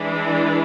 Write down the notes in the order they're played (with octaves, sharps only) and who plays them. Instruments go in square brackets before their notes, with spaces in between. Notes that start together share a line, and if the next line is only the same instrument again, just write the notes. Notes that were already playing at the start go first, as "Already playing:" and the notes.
Already playing: [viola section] E3 G#3 D4